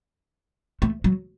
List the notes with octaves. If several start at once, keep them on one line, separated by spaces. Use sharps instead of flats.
A3
F#3